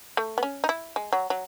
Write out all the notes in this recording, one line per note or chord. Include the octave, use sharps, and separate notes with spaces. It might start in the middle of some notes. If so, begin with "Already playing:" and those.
A3
B3
C#4
D#4
E4
G#3
F#3
F#3